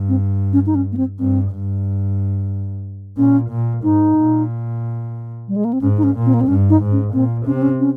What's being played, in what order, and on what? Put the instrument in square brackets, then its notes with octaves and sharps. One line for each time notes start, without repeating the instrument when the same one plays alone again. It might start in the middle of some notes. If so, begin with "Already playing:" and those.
Already playing: [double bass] G2
[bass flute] C4
C#4
D#4
C#4
A#3
C4
[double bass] G2 [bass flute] C4
[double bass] G2
[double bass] A#2 [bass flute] C#4
[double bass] A#2
[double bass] G#2 [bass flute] D#4
[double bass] A#2
[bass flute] G3
G#3
A#3
C4
[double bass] G#2 [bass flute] C#4
[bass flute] D#4
C#4
[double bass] A#2
[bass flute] C4
A#3
C4
[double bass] G2 [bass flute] C#4
[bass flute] D#4
[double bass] G#2
[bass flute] C#4
[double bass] A#2 [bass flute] C4
[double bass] C3 [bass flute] C#4
[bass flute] C4
C#4
C#4